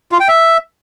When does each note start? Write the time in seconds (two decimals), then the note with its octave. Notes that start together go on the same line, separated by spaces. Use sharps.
0.12 F4
0.20 G5
0.28 E5